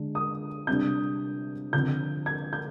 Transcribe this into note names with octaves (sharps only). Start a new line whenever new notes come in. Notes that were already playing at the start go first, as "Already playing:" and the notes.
Already playing: D3 G#3 D4
D#6
C3 G3 D4 G6
D3 F3 C4 G6
G#6
G6